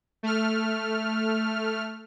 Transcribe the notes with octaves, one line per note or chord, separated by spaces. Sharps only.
A3 F6